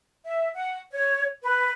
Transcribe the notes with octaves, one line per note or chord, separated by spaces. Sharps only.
E5
F#5
C#5
B4